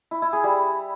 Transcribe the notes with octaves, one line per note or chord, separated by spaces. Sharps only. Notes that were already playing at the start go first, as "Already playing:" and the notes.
E4
E4
G#4
G3